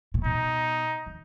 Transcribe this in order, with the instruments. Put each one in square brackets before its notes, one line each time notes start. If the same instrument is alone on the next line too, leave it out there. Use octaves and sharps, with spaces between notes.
[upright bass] A#2
[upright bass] B2 [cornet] D#4
[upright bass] D#3